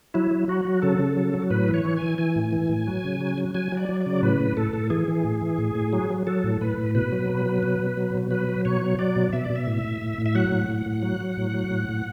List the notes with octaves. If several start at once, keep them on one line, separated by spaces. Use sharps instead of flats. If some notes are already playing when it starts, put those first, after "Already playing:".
F#3 E4
F#3
F#3 F#4
F#3
C#3 A4
C#3
F#3
F#3
A2 B4
E3
C#5
E3
G#5
E3
E3 G#5
A2
E3
A2
F#3
C#3
F#3
F#3
F#3 G#5
F#3
D5
F#3
D5
C#3
A2 B4
A2
A2 A4
A2
E3 G#4
E3
A2
E3
A2
A2
F#3
F#3
F#3 A4
A2
A2 B4
A2
B2 B4
F#3
B2
F#3
B2
B2
F#3
B2
F#3 B4
F#3
B2 C#5
F#3
F#3 D5
B2
B2 E5
D5
B2
E5
A2
A2
A2
A2
E5
F#3 F#5
A2
A2
A2
F#3
F#3
A2
F#3
A2
A2